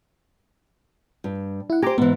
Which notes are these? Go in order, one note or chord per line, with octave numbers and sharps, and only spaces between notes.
G2
E4 F#5
G4 C5 G#5 A#5 D6
G#2 E3 B3